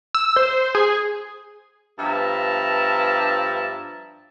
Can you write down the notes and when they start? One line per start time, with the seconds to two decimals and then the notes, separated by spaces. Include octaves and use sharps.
0.15 E6
0.36 C5
0.75 G#4
1.99 G2 F3 B3 E5 A5 A#5